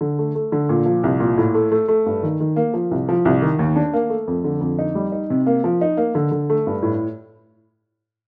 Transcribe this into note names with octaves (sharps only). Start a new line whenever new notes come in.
D3
A3
A3
D3
A#2
F3
C2
A#2
A2
A3
A3
A3
G2
D#3
D#3
A#3
F3
C2
F3
C2
D#3
D#2
D4
A#3
A3
F2
D3
F2
D#4
G3
D#4
C3
A#3
F3
D#4
A#3
D3
D3
A3
G2
A2